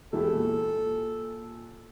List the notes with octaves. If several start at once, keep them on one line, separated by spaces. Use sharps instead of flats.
E1 E4 G4 A4
A#2